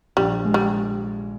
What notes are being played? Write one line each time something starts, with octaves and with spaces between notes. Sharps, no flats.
A#1 G3
G#3
G3